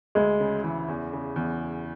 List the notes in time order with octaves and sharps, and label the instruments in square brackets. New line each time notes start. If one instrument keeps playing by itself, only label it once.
[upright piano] D2 [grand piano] G#3
[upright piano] C#3
E3
E2
C#3
E2